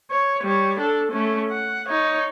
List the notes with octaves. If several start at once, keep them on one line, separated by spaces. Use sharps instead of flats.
C#5
G3 C#5
D4 A4
A3 C#4
F#5
D#4 C#5